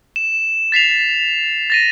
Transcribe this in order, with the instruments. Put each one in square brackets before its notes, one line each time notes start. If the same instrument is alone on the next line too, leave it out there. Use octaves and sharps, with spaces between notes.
[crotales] E7
A6 B6 C7 F7
A6 A#6 D#7